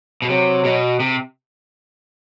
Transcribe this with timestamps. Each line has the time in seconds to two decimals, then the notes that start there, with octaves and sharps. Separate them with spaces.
0.22 B2
0.29 C3 F#3
0.65 B2
1.00 C3